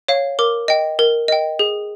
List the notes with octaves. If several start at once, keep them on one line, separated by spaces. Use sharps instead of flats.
C#5 F5
A#4 D6
D#5 G5
A#4
D#5 G5
G#4